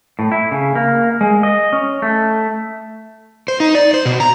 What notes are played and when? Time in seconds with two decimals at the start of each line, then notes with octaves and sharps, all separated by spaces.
0.19 A2
0.32 E4
0.52 C#3
0.76 A#3
1.21 G#3
1.43 D#5
1.73 C#4
2.02 A3
3.48 C5
3.60 D#4
3.75 D5
3.94 C5
4.06 B2
4.20 A#5